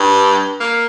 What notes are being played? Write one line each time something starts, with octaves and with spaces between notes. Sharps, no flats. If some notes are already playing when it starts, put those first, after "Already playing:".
Already playing: G2
A#3